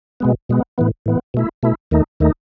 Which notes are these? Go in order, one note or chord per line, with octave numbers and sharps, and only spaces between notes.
B2 G#3 B3
B2 G#3 B3
A2 E3 B3
A2 E3 B3
B2 A3 E4
B2 A3 E4
D#2 D#3 A3 D#4
D#2 D#3 A3 D#4